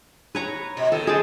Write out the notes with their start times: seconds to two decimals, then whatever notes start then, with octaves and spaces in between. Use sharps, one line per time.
0.35 B4 C#5 A#5
0.77 B2
0.92 D#3 A4
1.07 G#4 C5 A5